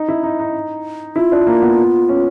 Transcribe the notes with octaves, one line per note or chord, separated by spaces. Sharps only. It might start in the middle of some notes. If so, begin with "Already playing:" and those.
Already playing: D#4
E4
D#4
D#4
E4 F4
D4
A#3
B3
C#4